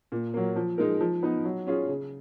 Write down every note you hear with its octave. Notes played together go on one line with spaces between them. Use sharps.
A#2
F#3 A#3
F3
G#3 D#4 A#4
F3
B3 D#4
F#3
C#4 F4 G#4
C#3